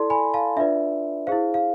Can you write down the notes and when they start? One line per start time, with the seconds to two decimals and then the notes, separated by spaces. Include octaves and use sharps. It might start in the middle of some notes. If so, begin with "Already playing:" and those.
Already playing: E4 A4 D5 A5 C6
0.10 G#5 B5
0.34 F5 A5
0.56 D4 F4 B4 D5 E5
1.27 E4 G#4 C5 F5
1.54 F5